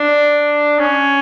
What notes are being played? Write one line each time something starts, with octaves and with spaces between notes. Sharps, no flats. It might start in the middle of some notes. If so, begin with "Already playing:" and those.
Already playing: D4
C#4